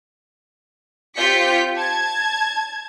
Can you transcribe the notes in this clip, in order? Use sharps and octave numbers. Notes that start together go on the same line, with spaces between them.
C4 F4 G4 G6 B6 C#7
A5 G#6